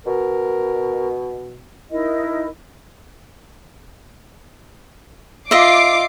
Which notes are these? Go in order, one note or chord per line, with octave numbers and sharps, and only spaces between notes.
B2 A#4
D#4 E4 A#4 D#5
F4 D#5 E5 D6 C7